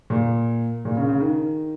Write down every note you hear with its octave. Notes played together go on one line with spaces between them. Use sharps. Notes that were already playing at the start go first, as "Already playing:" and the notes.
A#2
A#2
C#3
C#3
D#3